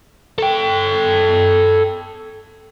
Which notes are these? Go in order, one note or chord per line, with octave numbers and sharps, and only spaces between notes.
A4 G5